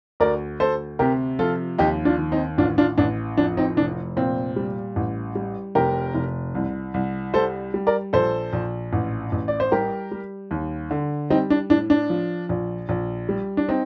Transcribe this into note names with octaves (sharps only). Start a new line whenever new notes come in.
D2 A#4 D5
D2 A4 C5
C3 G4 A#4
F3 F4 A4
D#2 D#4 G4
D4 F4
D#3
C4 D#4
A1 D4 F4
D4 F4
A1 D4
F2 D4
C4 D#4
F1 D4
A#2 C4
G3
A1
G3
F1 G4 A#4
F1
C2
C2
G3 A4 C5
G3
A#4 D5
A#1 A4 C5
A#1
A1
A1
D5
C5
G3 G4 A#4
G3
D#2
D3
G3 C4 D#4
D4
A2 D4
D4
F3
A#1
A#1
G3
D4
C4 D#4